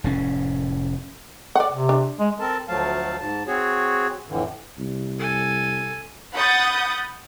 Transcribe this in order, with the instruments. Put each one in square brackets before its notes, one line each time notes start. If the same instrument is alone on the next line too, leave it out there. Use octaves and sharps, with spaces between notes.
[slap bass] F1 A2 C#4
[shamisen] D5 F#5
[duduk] C3
[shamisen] D4
[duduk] G#3
[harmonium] C4 A4 A#4 A5
D2 F3 F#3 A3 F5 A5
G#2 A5
C4 F#4 G#4 C#5
F2 A2 D3 E3
[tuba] C2
[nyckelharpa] A4 G#5
[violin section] F#5 B5 D#6 G6 A6